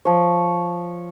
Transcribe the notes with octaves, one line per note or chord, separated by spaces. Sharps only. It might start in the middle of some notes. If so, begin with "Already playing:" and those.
F3 C#5